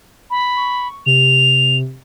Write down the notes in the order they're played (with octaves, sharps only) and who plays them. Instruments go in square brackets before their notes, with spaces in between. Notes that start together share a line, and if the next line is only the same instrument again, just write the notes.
[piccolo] B5
[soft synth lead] C#6
[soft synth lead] C3 [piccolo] F7